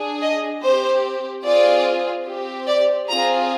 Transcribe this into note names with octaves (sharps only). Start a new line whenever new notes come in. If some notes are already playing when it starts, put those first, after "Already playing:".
Already playing: D4 G#4
D#5
C4 G4 C5
C4 F4 G#4 D5
C4 G4
D5
C4 F4 G#4 A#5